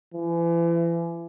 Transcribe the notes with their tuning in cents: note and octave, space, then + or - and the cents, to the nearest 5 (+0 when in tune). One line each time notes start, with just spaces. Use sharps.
E3 +35